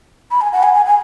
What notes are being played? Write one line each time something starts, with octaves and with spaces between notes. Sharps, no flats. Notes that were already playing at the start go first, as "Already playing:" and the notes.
B5
G#5
F#5
G#5
G#5
G#5